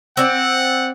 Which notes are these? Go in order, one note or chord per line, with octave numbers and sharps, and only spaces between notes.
C4 D5 F#5